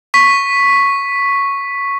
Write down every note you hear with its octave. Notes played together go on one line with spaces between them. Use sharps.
C#6 B6